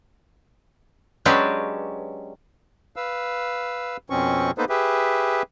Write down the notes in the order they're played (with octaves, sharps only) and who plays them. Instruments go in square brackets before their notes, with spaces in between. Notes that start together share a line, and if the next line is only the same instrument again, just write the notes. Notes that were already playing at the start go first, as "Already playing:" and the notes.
[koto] F#3 G#3 C#4 D4 G4 B4
[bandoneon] B4 F5 E6
F2 B2 C4 C#4 C#6
A#3 B3 D#4 A4 B4 C5
G4 G#4 B4 E5